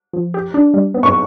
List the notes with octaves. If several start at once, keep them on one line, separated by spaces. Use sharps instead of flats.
F3
G4
D4
G3
B3
C#6